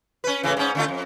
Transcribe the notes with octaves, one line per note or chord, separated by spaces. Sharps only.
C#4 B4
A2 C#3 E3
G#2 C#4
D3 A3 F4
F2